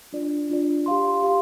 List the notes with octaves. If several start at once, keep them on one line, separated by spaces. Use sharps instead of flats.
D4 F4 D5
D4 F4 D5
G4 F5 C6
G4 F5 C6